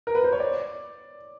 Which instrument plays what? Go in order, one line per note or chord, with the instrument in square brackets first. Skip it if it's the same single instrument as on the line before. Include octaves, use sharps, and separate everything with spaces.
[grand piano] A#4
B4
C5
C#5
D5